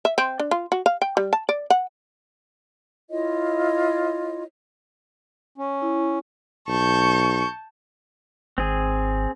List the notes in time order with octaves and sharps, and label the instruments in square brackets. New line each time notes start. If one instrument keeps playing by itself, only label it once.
[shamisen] E5
C4
D4
F4
F#4
F5
G5
G3
A5
D5
F#5
[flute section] E4 F4 C#5 D#5
[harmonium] C#4
[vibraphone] E4
[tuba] B1 [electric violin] A5 G6 [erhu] C#6
[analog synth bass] G#1 [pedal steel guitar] C4 G#4